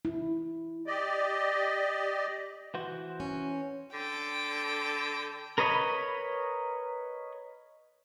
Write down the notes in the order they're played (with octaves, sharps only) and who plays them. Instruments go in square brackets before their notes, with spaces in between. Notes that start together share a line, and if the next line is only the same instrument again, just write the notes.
[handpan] E4
[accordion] G4 D5 D#5
[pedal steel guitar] E3 F#4 C5
[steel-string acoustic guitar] C#4
[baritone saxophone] D3 [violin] A4 G5
[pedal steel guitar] A#4 B4 C#5 D#5 B5